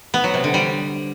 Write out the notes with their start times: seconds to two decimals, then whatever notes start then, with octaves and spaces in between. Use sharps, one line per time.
0.14 B3
0.24 F#3
0.34 C3
0.44 D3
0.54 G3